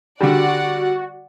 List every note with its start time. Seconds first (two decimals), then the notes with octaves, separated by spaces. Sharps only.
0.21 D3 G3 F#4 D5 F#5